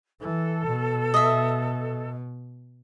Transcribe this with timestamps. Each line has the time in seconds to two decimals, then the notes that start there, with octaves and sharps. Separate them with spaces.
0.21 E3 A4
0.67 B2
1.14 D#5 E5